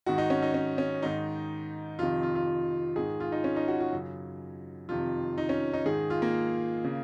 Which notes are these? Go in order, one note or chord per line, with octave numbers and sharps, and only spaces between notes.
G#2 D#3 F#4
D#4
C#4
D#4
C#4
C#4
G#2 D#3 D#4
F2 C3 D#3 F4
F4
F4
G#2 D#3 G#4
F4
D#4
C#4
D#4
F#4
F#4
F#2 C#3
F2 C3 D#3 F4
D#4
C#4
D#4
G#2 D#3 G#4
F4
A#3
C#3